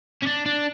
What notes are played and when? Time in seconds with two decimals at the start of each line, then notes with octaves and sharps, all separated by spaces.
0.22 C#4
0.26 D4
0.46 D4